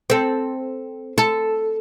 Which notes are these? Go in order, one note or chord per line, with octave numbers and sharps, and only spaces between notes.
C4 A4
A4